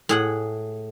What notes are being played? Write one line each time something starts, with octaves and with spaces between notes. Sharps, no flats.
A2 G#4 F#5